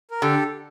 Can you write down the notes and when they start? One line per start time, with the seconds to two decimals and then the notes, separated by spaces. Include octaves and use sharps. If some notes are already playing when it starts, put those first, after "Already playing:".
0.11 A#4
0.22 D3 G4 A4